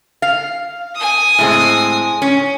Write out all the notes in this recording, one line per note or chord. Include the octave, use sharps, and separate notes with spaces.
F5
G#5 D#6
A2 G#3 C4
C#4